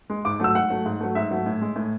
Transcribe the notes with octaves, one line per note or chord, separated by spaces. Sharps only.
G#3
G#2 D6
F#3 A3 E6
G#2 F#5
F#3 A3
G#2
F#3 A3
G#2 E5
F#3 A3
A2
G#3
A2